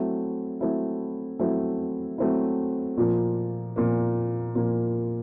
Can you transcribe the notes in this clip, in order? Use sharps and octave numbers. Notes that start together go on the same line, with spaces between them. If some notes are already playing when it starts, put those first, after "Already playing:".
Already playing: F#3 A3 C4 E4
F#3 A3 C4 E4
F#3 A3 C4 E4
F#3 A3 C4 E4
A#2 F3 A#3
A#2 F3 A#3
A#2 F3 A#3